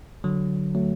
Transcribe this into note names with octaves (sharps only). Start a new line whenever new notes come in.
D3 F#3
F#3 A3